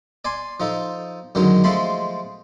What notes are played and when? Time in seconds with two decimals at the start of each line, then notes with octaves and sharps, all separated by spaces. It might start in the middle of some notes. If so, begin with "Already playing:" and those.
0.25 D5 G#5 C6
0.60 F3 D#4 A4
1.35 F#2 D3 D#3 F#3 G#3
1.64 F3 G#3 A3 A5 B5 C6